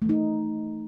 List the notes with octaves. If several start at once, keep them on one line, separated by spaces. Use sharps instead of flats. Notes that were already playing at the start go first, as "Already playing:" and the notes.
E3 A3 D#4